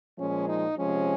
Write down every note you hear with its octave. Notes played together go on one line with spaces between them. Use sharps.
A#2 F3 G#3 C#4
D#4
C3 F3 G#3 C#4